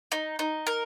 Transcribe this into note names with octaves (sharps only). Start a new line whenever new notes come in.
D#4
D#4
A#4